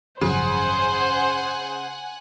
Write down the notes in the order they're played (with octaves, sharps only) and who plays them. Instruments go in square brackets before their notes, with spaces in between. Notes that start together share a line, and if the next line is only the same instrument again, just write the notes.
[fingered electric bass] G#1 F#2 F3 [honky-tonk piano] C#3 [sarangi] C5 [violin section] F#5 G#5 F#6